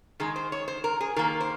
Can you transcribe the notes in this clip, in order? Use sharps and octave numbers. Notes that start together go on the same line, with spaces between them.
D#3 G#3 G#4
C5
C#5
C5
A#4
G#4
D#3 A#3 A#4
C5